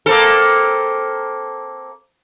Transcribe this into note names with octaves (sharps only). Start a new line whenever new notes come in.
A#3 C4 A4